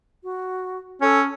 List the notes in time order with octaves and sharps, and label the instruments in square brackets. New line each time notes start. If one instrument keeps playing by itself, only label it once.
[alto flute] F#4
[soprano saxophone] C#4 [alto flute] A4